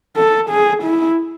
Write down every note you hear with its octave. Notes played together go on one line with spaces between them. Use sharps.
A4
G#4
E4